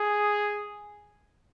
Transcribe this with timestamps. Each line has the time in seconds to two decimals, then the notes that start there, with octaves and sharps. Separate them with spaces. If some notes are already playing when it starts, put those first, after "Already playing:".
Already playing: G#4